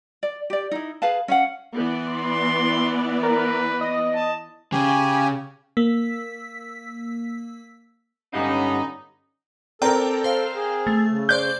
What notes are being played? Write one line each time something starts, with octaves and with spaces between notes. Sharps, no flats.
D5
G4 D5
D#4 E4
G#4 B4 F5 A5
C#4 F5 F#5
E3 B3 D5
C6
A#4 B4
D#5
A5
C#3 G4 G#5
A#3 E6 B6
G2 D3 B3 C#4 D#4 G4 F5
C4 A4 A#4 D5 G5 A#5
C5 F5
G#4
A3
C#3
C5 D5 G6 G7